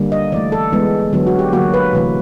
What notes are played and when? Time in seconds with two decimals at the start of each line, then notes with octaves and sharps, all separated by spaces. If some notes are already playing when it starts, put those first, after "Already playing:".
Already playing: D3 G3 A#3
0.12 D#5
0.32 E3 A3 D5
0.52 A4
0.72 E3 G#3 B3
1.13 D3 F#3 B3
1.27 F#4
1.39 G4
1.53 D3 F#3 A#3 F#4
1.74 B4
1.93 C3 E3 A3